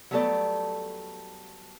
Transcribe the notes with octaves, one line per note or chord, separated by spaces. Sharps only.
F#3 G3 A3 B3 A4 D5